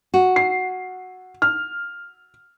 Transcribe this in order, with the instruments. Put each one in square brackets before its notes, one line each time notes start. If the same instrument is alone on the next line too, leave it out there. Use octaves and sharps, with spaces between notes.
[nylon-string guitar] F#4
[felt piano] C7
F6